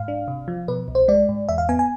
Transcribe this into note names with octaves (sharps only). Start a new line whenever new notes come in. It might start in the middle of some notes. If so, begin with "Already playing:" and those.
Already playing: G#2 F5
D4
C3
F3
B2 B4
C2
C5
G#3 D5
G#2
E2 E5
F5
B3 G#5
G#5